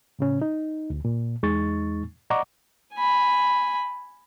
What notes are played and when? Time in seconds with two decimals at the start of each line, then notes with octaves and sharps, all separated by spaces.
0.19 A2 C#3 C#4
0.42 D#4
0.90 D2
1.05 A#2
1.43 E2 G#3 D#4 C#6 A6
2.30 D5 D#5 F#5 A#5 C#6 D6
2.95 G#5 B5